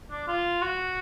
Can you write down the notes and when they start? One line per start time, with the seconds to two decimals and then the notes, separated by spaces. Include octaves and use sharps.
0.10 D4
0.27 F4
0.62 F#4